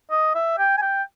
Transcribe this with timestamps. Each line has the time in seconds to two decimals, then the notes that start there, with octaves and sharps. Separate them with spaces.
0.11 D#5
0.35 E5
0.58 G5
0.77 G#5
0.82 G5